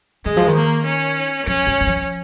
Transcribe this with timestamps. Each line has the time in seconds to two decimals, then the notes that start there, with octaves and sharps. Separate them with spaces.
0.25 D#3 G#3
0.37 F3
0.47 D#3
0.55 A#3
0.86 C#4
1.46 F3 C#4
1.67 G#3
1.81 D#3
1.87 F3